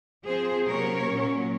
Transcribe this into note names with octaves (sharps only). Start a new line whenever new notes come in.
F3 C4 G#4 C5
C3 F#3 A#3 C#4 A#4 C#5
A#2 F#3 C#4